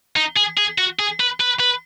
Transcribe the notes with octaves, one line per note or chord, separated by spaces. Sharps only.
D#4
G#4
G#4
F#4
G#4
B4
B4
B4